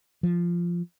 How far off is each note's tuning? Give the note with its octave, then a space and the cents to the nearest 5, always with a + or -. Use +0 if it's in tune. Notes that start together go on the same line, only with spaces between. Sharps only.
F3 -10